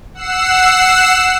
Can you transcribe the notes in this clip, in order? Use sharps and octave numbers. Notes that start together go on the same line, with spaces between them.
F#5 E6 C7 E7